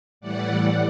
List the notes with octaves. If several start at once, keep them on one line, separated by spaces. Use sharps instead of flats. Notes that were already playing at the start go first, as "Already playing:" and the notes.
A2 E3 G3 D5 F#5